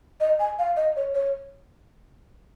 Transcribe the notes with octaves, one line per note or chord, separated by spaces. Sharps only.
D#5
G#5
F5
D#5
C#5
C#5